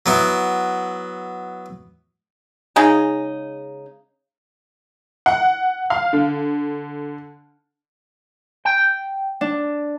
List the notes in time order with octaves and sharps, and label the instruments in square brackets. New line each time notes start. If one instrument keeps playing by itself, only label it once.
[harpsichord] F#3 B3 E4
[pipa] C#3 G#3 D#4
[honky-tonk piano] F#5
F5
D3
[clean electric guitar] G5
[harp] D4